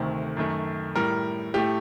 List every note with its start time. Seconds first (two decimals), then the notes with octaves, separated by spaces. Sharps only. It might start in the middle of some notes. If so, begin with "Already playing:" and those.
Already playing: D2 C3 D#3 A3
0.37 F#2 D#3 A3
0.95 A2 G3 A#4
1.54 A2 A3 G4